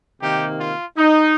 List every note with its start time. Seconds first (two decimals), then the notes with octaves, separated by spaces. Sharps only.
0.20 C3 D#3 A#3 D#4 G4
0.59 F4
0.97 D#4